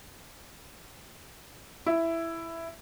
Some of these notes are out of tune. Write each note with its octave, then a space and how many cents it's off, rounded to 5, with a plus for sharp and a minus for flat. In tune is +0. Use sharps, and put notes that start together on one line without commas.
E4 +5